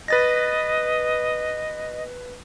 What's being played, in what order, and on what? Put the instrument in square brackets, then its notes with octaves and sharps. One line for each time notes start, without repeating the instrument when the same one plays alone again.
[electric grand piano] B4 A6 A#6 [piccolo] D#5